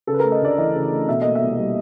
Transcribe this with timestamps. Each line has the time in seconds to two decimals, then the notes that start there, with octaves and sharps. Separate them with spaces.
0.07 C#3 A4
0.14 B4
0.20 A#4
0.24 A3
0.32 D#5
0.42 D2 D5
0.58 E3 D#5
0.75 C#3
0.92 A3
1.08 B2 E5
1.22 A#3 D#5
1.35 E5
1.42 C2
1.58 G3